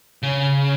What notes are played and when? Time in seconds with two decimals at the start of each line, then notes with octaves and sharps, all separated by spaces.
0.23 C#3